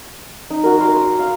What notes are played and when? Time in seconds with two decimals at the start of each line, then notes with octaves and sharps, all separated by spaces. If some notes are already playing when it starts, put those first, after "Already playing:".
0.50 D#4
0.64 F#4 A#4
0.78 A#4 G#5 C6 D6
0.96 D#6
1.19 F5